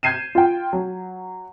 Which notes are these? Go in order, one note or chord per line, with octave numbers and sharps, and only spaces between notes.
G6 G#6 C7 D#7 E7
F4 G5
F#3